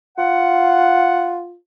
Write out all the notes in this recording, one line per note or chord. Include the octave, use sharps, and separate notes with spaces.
F4 F#5